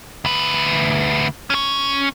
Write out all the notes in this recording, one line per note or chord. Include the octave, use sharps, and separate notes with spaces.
D2 B4
C#4 C#5